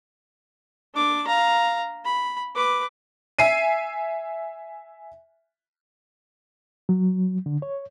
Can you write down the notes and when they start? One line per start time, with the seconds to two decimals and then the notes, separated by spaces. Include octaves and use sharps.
0.95 D4 D6
1.27 F5 A#5
2.05 B5
2.55 B4 D6
3.39 E5 G#5 C7 D#7
6.89 F#3
7.46 D3
7.62 C#5